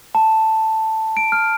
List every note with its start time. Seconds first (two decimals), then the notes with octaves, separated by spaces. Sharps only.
0.15 A5
1.17 D7
1.32 F6